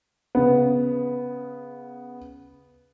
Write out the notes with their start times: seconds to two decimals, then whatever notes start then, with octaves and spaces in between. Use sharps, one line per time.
0.35 C#3 B3